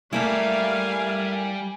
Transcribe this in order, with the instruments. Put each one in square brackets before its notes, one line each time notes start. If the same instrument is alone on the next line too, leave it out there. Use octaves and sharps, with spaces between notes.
[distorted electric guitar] G3 [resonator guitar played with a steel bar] A3 A#3 E4 [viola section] F5 [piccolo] G#5